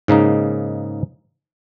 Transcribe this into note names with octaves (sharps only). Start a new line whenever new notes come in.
G#2 C#3 A#3 D#4